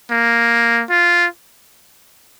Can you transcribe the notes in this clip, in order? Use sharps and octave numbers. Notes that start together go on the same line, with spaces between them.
A#3
F4